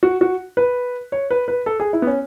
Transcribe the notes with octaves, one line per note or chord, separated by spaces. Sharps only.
F#4
F#4
B4
C#5
B4
B4
A4
G#4
E4
B3
C#4